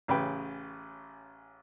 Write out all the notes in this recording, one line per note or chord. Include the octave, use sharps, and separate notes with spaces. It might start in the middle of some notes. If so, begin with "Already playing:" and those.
A1 C#3 B4 G5